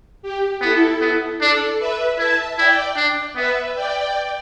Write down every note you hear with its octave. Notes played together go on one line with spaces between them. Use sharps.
G4
B3 E4 A4
B3
D4 A4 D5
B4 E5
E4 E5 A5
E4 D5 G5
D4
B3 B4 E5
D5 G5